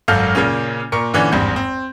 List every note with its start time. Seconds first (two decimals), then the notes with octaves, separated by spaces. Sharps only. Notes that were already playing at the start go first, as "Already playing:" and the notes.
0.08 G#1 F#2 A4 F5 F6 G6
0.35 A#2 C#3 A#3 C#4
0.92 A#2 A#4 C#6 C#7
1.14 A#2 D3 E3 C#4
1.32 G#1 E2 G2 C4 G6
1.56 C4